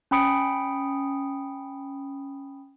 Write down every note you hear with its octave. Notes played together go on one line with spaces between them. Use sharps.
C#4 G5 B5 D#6 C#7 D7